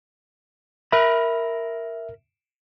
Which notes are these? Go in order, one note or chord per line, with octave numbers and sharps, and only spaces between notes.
A#4 E5 B5